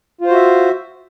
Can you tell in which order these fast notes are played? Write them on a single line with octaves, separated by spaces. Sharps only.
F4 C5 F#4 E5